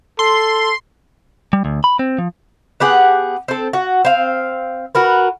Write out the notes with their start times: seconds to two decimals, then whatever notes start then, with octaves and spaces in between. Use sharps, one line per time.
0.19 A4 C6
1.53 G3
1.65 D2
1.84 B5
1.99 C4
2.19 F3
2.80 B3 G4 G#4 F#5
3.48 C4 A4
3.73 F#4
4.05 C4 F5
4.95 F#4 A#4 B4